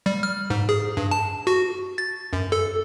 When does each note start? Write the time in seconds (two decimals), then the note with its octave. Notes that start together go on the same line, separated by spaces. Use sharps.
0.06 G3
0.23 F6
0.50 G#2
0.69 G#4
0.97 G2
1.11 A5
1.47 F#4
1.98 A6
2.33 F#2
2.52 A4